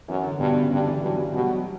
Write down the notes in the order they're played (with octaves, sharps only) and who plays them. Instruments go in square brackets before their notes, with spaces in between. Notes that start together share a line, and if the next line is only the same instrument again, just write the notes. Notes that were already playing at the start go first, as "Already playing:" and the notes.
[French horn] F#2 [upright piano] E3
[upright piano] D3
[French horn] G2 [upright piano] B2
[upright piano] C#3
[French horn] G2 [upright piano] D3
[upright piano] E3
[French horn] G2 [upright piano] F#3
[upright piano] G3
[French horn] B2 [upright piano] G3
[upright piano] F#3